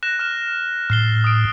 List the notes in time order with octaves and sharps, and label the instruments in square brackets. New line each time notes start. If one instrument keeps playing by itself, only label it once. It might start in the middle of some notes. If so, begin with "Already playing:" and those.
[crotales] F#6 A#6 E7
F6 E7
[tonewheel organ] A2 [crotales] F6 C7 G7
[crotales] D#6 D7